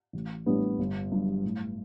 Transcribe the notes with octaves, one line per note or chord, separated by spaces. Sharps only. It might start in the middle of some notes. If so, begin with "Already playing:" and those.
A1
A2 G3 B3 D4
G1
G2 F#3
A2